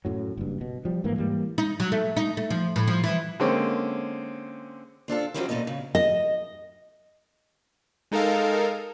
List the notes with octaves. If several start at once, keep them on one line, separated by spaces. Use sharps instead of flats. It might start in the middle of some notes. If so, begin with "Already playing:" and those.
F#2 A2 F#3
F#1 G2
B2
F3 G3
A1 G#2 E3 A#3
G#2 E3 G3 A#3
D#4
F#3
A3
D#4
A3
F3
A2
F3
E3
D3 G#3 A#3 C4 C#4
C4 D4 F4 A4
F3 F#3 C4 C#4 E4 G4
A#2 A3 B3 A4 D#5
C#3
D#5
G#3 D#4 A4 A#4 F5